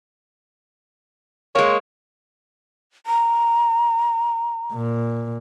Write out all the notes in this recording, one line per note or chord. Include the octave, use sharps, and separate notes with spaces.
G#3 A#3 C#5
A#5
A#2